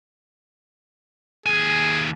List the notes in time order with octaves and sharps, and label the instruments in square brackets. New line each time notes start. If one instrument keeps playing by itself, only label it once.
[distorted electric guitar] D#2 G#5 [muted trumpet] G#4